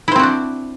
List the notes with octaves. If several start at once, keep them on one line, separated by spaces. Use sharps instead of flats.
C4 D4 E4 F#4 C5